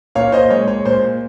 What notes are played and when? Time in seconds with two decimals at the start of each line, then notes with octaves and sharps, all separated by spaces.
0.15 A#2 C#5 F5
0.32 C5 D#5
0.50 G#3 C#5
0.68 C#5
0.85 A#2 C5